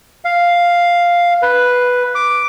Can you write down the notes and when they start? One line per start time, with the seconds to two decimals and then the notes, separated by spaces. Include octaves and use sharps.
0.25 F5
1.42 B4
2.15 D6